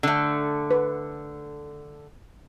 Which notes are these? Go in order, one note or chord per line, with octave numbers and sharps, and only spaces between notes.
D3 A3
B4